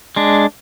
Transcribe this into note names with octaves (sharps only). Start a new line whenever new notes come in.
G#3 D4